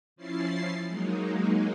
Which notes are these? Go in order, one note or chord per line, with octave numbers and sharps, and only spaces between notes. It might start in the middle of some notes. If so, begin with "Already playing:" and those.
F3 C#4 E4 A6 C7
F#3 G#3 A#3 D#4